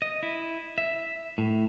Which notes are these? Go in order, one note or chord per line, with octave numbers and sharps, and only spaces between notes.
D#5
E4
E5
A2